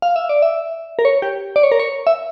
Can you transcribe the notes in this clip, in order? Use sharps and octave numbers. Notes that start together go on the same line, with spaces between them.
F5
E5
D5
E5
A#4
C#5
G4
D5
C#5
A#4
C#5
E5